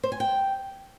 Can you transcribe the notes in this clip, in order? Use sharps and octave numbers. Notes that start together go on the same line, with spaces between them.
C5
G#5
G5